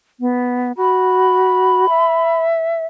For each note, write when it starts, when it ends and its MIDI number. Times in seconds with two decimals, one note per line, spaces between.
0.20 0.72 59
0.77 1.89 66
0.77 2.39 83
1.89 2.85 76